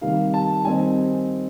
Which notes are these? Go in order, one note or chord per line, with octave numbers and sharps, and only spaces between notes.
C3 D#3 G3 F5
A5
D#3 G3 C4 D#4 G#5